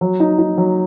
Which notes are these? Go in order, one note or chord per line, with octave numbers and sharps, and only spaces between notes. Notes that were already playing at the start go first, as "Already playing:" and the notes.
F#3
D#4
D#4
F#3